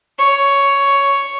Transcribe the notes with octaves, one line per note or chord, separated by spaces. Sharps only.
C#5